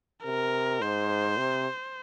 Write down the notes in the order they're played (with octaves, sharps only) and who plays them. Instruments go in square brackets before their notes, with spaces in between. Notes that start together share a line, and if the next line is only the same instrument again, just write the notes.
[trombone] C3 [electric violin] A#4
[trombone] G#2 [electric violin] C5
[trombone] C3